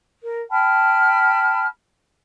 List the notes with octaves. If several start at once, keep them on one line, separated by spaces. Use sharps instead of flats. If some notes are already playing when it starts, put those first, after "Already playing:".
A#4
G5 A5 B5 F6